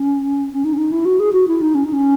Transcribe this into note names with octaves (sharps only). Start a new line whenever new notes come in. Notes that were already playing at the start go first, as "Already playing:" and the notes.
Already playing: C#4
C#4
D#4
C#4
D#4
E4
F#4
G#4
F#4
E4
D#4
C#4
D#4
C#4